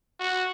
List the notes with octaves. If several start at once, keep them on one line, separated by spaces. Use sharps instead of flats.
F#4